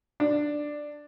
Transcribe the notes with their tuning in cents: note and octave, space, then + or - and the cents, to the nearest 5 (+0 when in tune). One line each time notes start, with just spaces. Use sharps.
D4 +5